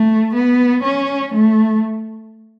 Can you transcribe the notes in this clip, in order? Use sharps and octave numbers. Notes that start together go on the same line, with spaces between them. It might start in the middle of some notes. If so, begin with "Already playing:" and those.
Already playing: A3
B3
C#4
A3